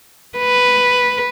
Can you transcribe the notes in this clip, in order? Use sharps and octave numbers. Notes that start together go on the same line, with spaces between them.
B4